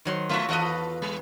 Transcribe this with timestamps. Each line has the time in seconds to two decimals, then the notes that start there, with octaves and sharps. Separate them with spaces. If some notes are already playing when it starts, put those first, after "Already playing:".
0.05 D#3 F#3 C6
0.29 G#3 F4 F#4 E5
0.49 E2 F4 A4 B4 D#5
1.02 G3